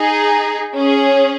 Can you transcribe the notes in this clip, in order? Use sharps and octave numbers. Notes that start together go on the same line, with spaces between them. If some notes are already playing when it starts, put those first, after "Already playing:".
Already playing: D#4 G#4
C#4 G#4